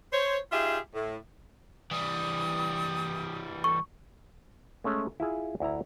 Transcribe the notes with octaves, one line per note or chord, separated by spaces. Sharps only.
C5 C#5
D#4 F4 G4 G#4 E5
A2
E3 G3 D#6
A4 C#6
G#3 A3 C#4
E4 F4 G#4
D2 E4 A#5